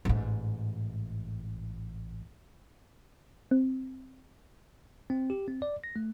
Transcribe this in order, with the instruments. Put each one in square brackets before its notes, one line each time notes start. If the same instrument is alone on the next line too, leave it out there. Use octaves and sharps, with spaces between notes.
[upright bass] A1 G#2
[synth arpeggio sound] C4
[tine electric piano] C4
G4
C4
D5
A#6
A3